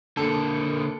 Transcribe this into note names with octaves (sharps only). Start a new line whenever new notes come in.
D3 A#3 A4